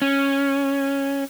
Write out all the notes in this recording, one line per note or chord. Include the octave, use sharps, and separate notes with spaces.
C#4